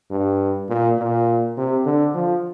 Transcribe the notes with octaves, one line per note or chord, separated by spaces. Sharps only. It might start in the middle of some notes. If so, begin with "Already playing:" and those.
G2
A#2
A#2
C3
D3
F3